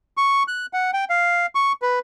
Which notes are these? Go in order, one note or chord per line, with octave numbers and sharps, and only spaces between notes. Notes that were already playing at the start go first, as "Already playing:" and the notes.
C#6
F#6
F#5
G5
F5
C#6
B4